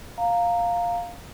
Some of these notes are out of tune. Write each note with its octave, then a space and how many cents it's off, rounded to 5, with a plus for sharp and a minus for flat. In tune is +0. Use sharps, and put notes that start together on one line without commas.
F5 +5 A#5 -10